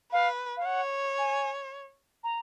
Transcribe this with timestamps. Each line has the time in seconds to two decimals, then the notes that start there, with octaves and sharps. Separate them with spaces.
0.12 B4 F5
0.57 F5
0.65 C#5 F#5
1.18 G#5
2.24 A#5